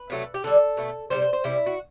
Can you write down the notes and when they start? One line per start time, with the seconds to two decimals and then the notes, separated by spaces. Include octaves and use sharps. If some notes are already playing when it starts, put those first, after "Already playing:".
Already playing: B4
0.10 C3 F#3 A3
0.34 G4
0.44 D3 G3 A4
0.77 B2 A3
1.10 C3 E3 G3 C5
1.22 C5
1.33 C5
1.44 C3 G3 E4
1.66 F#4